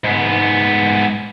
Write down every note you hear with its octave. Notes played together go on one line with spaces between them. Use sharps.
G#2 B3